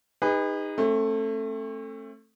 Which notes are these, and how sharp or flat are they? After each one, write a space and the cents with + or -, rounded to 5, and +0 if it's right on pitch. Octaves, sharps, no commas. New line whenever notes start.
D#4 +0 G#4 -40 B4 +0
A3 +10 C4 +45